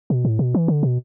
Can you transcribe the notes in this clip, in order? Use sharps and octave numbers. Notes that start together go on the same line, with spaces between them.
B2
A2
B2
E3
D3
B2